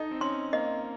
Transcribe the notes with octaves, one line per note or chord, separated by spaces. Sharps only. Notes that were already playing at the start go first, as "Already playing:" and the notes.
Already playing: D#4 A4 D#5
C4
C#4 C6
A#3 D#5